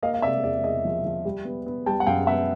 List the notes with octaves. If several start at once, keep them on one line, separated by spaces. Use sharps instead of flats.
A#3 D#5 F5
F5
C3 D5 E5
E2 D5
E2 D#5
F3
F3
G3
B3
B3
G3 G5 A5
F#5
F#2 F5 G5
B3 E5 F#5